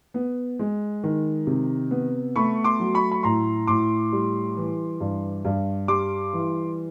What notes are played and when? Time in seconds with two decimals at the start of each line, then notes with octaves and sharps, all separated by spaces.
0.14 B3
0.59 G#3
1.04 D#3
1.47 C3
1.91 B3
2.36 A3 B5 C#6
2.64 C6 D6
2.80 F#3
2.94 B5 C#6
3.12 B5
3.23 A2 A#5 C6
3.67 A2 C6 D6
4.12 G3
4.57 E3
5.00 G2
5.45 G2
5.88 G3 C6 D6
6.33 E3